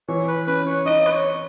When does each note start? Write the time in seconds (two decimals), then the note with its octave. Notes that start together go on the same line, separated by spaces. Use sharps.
0.08 E3 C#5
0.28 B4
0.47 C#4 B4
0.66 C#5
0.86 D#4 D#5
1.06 B4
1.11 C#5